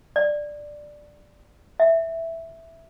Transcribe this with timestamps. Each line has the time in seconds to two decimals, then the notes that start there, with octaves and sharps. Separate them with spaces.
0.16 D5
1.80 E5